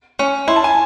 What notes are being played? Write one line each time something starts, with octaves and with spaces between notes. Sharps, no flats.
C#4
E4 C6
A5
G#5